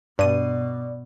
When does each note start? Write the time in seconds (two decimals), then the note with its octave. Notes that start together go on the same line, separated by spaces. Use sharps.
0.19 G2 B2 D5 D#7